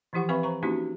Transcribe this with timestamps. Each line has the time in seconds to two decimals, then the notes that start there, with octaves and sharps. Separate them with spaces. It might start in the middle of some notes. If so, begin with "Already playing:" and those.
0.13 E3 F3 E4 G4 F#5 C#6
0.29 C4 B4 E5 F5 B5 C#6
0.43 C5 A#5 C#6
0.63 A#3 C#4 D#4 E4 F#4 G4